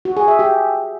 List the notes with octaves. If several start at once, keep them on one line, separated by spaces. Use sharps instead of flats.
F#4
G#4
E5
G4